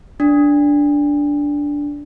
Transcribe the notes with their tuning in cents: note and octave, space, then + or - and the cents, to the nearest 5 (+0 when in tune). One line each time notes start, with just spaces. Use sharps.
D4 -10